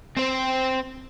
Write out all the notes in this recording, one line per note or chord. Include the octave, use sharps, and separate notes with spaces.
C4 C5